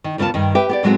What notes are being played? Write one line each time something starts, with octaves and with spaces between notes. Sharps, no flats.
D#3
D#2 C#3 B3 F4 A5
G2 D#3
G4 B4 E5 G5
B3 G4 D5
A2 F#3 G#3 B3 C4 F#4